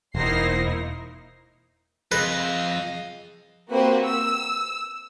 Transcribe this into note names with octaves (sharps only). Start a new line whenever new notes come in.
E1 A#3 D#4 E4 C5 A#6 C7
F2 G#4 B4 D#5 F5 A#6
A#3 C4 F#4 G4 B4 C5
E6